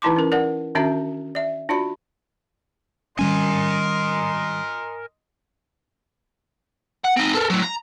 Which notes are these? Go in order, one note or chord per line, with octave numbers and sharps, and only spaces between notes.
E3 D#4 E4 A5 C6 D6
C#4 A#4
A#4 D5 F#5
D#3 C#4 D4 F#4 E5 A#5
D5 E5
D4 F4 F#4 D5 B5
D#3 G3 C#4 A#4 D#5 G#5 C6
F#5
C4 D#4
A4 A#4
A2 F#3
A#5